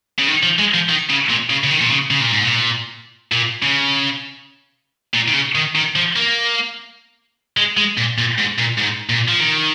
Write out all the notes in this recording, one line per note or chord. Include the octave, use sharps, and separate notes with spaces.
C#3
D#3
F3
G#3
F3
D#3
C#3
A#2
C#3
C#3
D#3
A#2
C#3
C#3
A#2
G#2
A#2
A#2
C#3
A#2
D#3
C#3
D#3
D#3
F3
A#3
G#3
G#3
A#2
A#2
G#2
A#2
G#2
A#2
F3
D#3